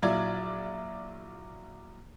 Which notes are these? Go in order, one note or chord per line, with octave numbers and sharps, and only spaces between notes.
A#1 F#3 E4 F4 D5 G#6